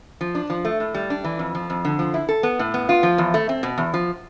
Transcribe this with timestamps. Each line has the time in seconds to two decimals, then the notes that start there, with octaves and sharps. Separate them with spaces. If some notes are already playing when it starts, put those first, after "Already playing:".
0.21 F3
0.35 D4
0.50 F3
0.65 A3
0.80 A2
0.95 G3
1.10 D4
1.24 E3
1.39 F2
1.55 F3
1.70 F2
1.85 D3
1.99 F3
2.14 E4
2.29 A4
2.43 B3
2.59 A2
2.74 B3
2.89 F4
3.03 F3
3.18 E2
3.34 A3
3.49 C4
3.63 B2
3.78 E2
3.94 F3